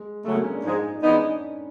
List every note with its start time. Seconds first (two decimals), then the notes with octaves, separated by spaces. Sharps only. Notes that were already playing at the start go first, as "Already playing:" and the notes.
Already playing: G#3
0.24 C#3 F#3 G#3 A3
0.35 A#3
0.44 C#4
0.54 D4
0.63 G#2 F3 G#3 D#4
0.95 D4
1.02 E3 G#3 B3 C#4 D#4